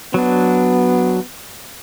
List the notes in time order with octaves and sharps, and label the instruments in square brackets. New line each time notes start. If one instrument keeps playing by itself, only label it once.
[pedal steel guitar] F#3 D4 [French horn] B3